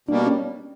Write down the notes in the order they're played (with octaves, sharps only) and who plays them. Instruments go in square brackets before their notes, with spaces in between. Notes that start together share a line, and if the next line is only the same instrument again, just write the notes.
[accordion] B2 G3 A#3 [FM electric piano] D4
[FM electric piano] C#4